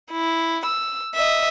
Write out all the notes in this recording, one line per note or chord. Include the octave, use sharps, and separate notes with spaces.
E4
E6
D#5 E5